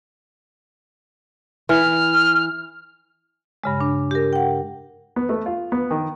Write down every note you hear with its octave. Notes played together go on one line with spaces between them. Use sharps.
E3 F6
G2 C#3 G#3
D4
G4 A#4
F#5 G5
B3
A3
F4
B3
D#3